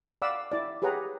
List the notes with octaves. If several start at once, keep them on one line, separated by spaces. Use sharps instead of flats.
D5 F5 F#5 B5 D6 E6
E4 D5
G4 G#4 B4 C#5 F#5 A#5